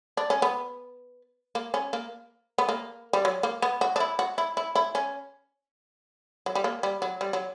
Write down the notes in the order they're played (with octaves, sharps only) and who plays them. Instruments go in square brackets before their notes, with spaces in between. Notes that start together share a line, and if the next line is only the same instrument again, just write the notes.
[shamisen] D4
C#4
B3
A#3
C#4
A#3
B3
A#3
G3
F#3
A#3
B3
F#4
D4
E4
F#4
E4
E4
E4
C#4
F#3
G3
A#3
G3
F#3
G3
F#3